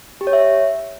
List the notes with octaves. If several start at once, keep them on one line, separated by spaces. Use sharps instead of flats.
G4
C#5
E5